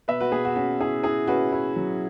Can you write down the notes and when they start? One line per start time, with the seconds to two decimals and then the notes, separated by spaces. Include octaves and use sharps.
0.08 B2 B4 E5
0.20 F#4 B4
0.32 B2 G#4
0.45 F#4
0.56 C#4 F#4
0.80 E4 G#4
1.03 E4 G#4
1.27 C#4 F#4 B4
1.52 E4
1.76 F#3